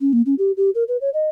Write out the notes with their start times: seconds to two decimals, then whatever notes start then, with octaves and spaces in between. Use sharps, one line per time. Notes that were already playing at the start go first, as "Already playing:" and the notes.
0.01 C#4
0.13 A#3
0.26 C#4
0.39 G4
0.57 G4
0.75 A#4
0.88 B4
1.01 C#5
1.14 D#5